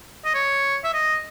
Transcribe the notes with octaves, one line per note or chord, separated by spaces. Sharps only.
D#5
C#5
E5
D#5